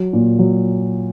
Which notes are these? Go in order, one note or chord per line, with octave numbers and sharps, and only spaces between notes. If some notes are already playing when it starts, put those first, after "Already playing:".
Already playing: F#3
A#2
F#3